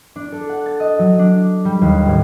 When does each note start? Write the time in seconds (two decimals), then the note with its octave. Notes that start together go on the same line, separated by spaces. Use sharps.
0.16 D4
0.32 A4
0.49 F#5
0.66 A6
0.80 D#5
0.99 F#3
1.19 D4
1.65 G3
1.81 D#2
2.06 A1